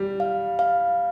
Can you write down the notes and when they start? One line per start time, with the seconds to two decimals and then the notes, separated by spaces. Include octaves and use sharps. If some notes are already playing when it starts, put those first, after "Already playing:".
Already playing: G3
0.20 F5
0.59 F5